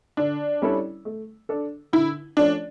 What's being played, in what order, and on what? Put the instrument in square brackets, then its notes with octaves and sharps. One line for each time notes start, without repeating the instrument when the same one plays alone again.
[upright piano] D3 [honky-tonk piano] D4
[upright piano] G3 C#4 E4 A4
A3
D4 A4
[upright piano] D3 [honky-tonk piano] E4
[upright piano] F3 A3 C#4 [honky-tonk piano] D4